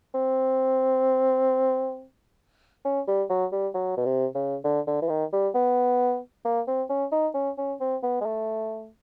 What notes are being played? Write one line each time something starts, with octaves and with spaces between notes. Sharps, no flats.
C4
C#4
G3
F#3
G3
F#3
B2
C3
C#3
D3
D3
E3
D#3
G3
B3
A#3
C4
C#4
D#4
C#4
C#4
C4
B3
G#3
A3